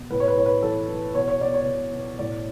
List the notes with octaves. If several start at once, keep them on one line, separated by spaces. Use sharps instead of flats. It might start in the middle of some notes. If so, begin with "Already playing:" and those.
Already playing: B2
A2 B4
C#5
B4
A2 C#5
B4
E3 A4
E3
B2 C#5
C#5
B2 D5
C#5
B2
B2
A2 D5